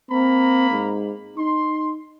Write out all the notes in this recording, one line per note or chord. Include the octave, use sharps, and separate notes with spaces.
A#3 C4 A#5 B5
G#2
D#4 C6